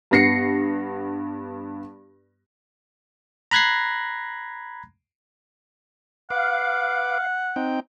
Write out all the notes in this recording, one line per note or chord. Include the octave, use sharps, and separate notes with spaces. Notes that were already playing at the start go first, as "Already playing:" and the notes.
G2 B3 A#6 C7 C#7
A#5 B5 F#6 G#6 A#6 C7
B4 F5 F#5 D6
C4 D#4 G5